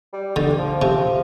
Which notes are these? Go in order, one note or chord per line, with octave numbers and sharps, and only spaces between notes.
G3
D3 G3
F3
C3 F3